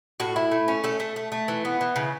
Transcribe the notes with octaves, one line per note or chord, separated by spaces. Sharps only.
A2 F#4
E4
A3
C#4
A3 A4
A3
A3
A3
E3
B3
E3
C#3